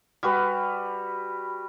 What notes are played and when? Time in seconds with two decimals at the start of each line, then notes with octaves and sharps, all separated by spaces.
0.23 G3 F#4 B4